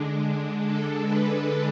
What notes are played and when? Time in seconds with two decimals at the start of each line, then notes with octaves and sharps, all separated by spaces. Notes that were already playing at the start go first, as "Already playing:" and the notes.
Already playing: D3 G#3 D4
0.59 A4
1.05 B4